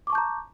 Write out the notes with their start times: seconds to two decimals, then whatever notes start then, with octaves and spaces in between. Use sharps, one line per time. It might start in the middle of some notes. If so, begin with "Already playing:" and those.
0.07 D6
0.10 C#6
0.12 A5
0.15 G6
0.18 A#5